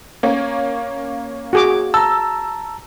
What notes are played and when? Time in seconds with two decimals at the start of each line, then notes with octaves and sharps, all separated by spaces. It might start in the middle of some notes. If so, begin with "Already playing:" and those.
0.23 A#3 C#4
1.53 F#4 G#4 D6
1.94 A5 A#5 E6